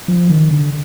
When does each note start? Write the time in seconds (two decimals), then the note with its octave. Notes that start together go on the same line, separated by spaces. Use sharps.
0.08 F3
0.30 D#3
0.51 D3